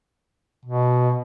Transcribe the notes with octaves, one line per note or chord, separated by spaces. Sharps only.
B2